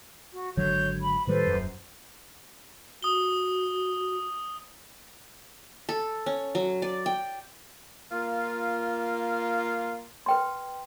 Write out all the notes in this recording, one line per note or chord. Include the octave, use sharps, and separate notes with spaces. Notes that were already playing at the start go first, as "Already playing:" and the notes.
F#4
G#1 D3 F#3 C#5 G6
B5
A2 D#3 G3 A4 B4 C5
D#1 F#2
F#4 D#6 G7
A4
C#4
F#3
D5
G5
A#3 F4
B4 G5 C6